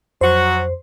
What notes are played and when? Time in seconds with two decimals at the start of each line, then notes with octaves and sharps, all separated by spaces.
0.21 F2 F#3 F#4 C5